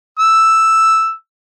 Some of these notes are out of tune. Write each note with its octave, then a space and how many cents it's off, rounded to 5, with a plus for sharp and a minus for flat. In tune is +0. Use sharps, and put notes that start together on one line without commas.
E6 +0